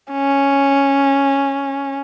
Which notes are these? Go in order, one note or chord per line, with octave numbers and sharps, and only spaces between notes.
C#4